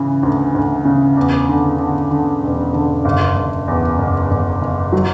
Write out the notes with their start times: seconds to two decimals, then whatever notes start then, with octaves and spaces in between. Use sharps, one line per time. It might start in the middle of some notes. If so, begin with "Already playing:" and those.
Already playing: C#3 E3
0.23 D2
0.55 D2
0.85 C#3
1.17 E2
1.49 D3
1.79 D3
2.11 D3
2.42 E1
2.73 D3
3.05 F#1
3.37 F#1
3.68 E2
3.98 F#1
4.31 F#1
4.62 F#1
4.93 F#3